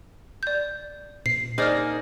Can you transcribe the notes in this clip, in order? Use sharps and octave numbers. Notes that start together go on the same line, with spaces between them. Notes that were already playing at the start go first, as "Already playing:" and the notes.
D5 G6
A#2 C7
A#3 D#4 G#4 C5 D5 F6